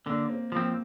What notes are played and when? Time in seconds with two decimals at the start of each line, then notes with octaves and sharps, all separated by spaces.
0.06 D3 A#3
0.29 C4
0.52 F3 A#3 C4